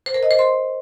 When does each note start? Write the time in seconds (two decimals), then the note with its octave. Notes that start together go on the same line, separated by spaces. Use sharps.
0.06 C5
0.14 A#4
0.23 D#5
0.31 C5
0.39 C6